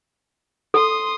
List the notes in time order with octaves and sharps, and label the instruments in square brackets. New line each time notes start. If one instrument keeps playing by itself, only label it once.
[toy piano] A4 [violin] C6 D#6